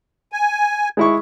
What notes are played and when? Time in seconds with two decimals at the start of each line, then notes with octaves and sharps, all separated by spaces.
0.32 G#5
0.97 G#3 E4 C#6